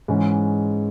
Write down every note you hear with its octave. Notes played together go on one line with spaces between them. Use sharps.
G#2 E3 G#3 C#4